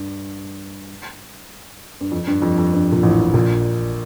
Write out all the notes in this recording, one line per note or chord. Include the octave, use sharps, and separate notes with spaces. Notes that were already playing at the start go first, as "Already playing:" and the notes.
Already playing: G2
G2
F2
G2
F2
F2
G2
A#2
A1 A2
A#1 A#2